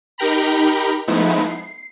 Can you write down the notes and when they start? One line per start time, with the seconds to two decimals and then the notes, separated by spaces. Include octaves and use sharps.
0.18 D#4 G4 A#4 G5 A#5 B5
1.08 F3 G#3 A3 B3 D#4 E4
1.48 C7